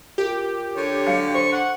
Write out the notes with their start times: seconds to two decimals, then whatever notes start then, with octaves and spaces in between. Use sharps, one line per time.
0.18 F4 G4 A#4
0.77 D3 C#5
1.07 F#3 F5 C#7
1.35 C5 C#6
1.52 F#5